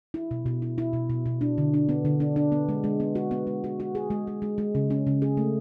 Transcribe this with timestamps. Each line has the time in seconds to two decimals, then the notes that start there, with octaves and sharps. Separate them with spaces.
0.14 E4
0.31 B2
0.46 B2
0.62 E4
0.78 E4
0.93 B2
1.10 B2
1.26 B2
1.41 D4
1.58 D3
1.74 D4
1.89 B3
2.05 D3
2.20 D4
2.36 D4
2.52 B3
2.69 G#3
2.84 G#3
3.00 B3
3.15 F#4
3.31 B3
3.47 G#3
3.64 F#4
3.80 F#4
3.95 G#4
4.10 G#3
4.27 G#3
4.42 G#3
4.58 G#3
4.75 C#3
4.90 C#4
5.07 C#3
5.22 G#4
5.37 A3